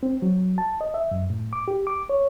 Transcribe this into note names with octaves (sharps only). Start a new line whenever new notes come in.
C4
F#3
A5
D#5
E5
F#2
A2
D6
G4
D6
C#5